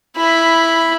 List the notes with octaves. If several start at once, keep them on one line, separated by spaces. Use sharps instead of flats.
E4 B5